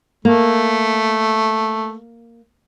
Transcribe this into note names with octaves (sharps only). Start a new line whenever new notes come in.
A3 A#3